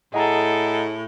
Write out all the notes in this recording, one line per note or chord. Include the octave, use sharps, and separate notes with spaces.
A2 G#4 A4 D#5 F#5 A#5